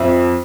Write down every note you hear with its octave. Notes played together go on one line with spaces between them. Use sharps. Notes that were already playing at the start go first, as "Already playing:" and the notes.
Already playing: F2 E5